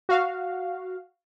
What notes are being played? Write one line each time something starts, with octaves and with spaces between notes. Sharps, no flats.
F#4 F5